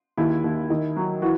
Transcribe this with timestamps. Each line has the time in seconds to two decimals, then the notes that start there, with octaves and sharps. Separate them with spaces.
0.17 D#2 E4
0.44 D#2
0.70 D#3
0.96 F#3
1.22 E3 F#4